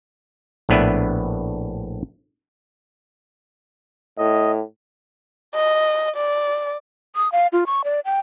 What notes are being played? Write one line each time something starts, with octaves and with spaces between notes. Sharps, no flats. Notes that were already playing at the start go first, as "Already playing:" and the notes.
A#1 A2 B3 D4 B4 E5
A2 D#5
D#5
D5
D#6
F5
F4
C#6
D5
G5